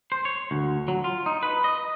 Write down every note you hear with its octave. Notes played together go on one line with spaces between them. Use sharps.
C5
C#5
D2
F#3
F4
D#4
B4
D#5